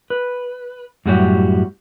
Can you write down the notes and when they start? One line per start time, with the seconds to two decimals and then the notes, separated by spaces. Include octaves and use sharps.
0.10 B4
1.06 F#2 A2 G3 F#4 G4 C#5